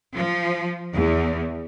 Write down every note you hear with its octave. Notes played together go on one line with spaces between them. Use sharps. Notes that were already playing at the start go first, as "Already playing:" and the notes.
F3
E2